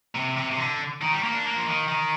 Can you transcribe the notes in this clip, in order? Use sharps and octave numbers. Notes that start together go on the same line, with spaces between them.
C3
C3
C3
D3
D#3
G3
A#3
D4
A#3
F3
D#3
D#3